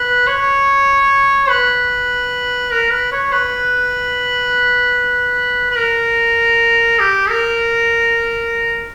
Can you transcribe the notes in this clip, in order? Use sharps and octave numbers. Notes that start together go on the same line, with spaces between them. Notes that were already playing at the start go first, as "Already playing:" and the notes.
Already playing: B4
C#5
B4
A#4
B4
C#5
B4
B4
A#4
G4
A#4